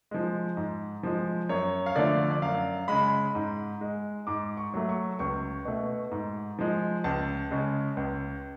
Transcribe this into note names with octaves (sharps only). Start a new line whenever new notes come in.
F3 G#3
G#2
F3 G#3
F#2 C#5
F5
D3 F3 A3 D5
D5
F#2 F5
C#3 G#3 B5
G#2
G#3
G#2 D6
C#6
F#3 A3
C#6
C#2 C#6
B2 A3
G#2
F3 G#3
C#2 A5
C#3 G#3
C#2